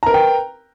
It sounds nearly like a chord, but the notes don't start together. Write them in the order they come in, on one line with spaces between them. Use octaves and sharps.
A#5 A#4 B4 G5